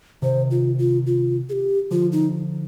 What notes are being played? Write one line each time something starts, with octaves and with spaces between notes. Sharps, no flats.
C3 D#3 C5
F4
F4
F4
G#4
G4
D3 F3 F4
D#4